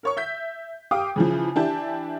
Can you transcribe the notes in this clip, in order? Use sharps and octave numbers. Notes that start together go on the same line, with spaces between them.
A#4 C#5 C#6
E5 G6 B6
G4 F5 G5 D6 D#6
C#3 E3 F3
E3 D4 E4 G4 A5 G6